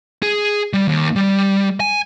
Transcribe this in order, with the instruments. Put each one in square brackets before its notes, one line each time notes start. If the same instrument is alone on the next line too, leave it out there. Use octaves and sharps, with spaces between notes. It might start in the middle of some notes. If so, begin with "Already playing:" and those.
[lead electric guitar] G#4
G3
D#2
G3
G#5